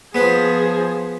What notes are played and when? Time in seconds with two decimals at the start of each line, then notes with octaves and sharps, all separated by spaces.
0.15 F3 B3 G#4 B4 C5